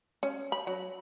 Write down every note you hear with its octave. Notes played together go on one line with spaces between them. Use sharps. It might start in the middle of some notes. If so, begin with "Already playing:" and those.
C#4
B5
F#3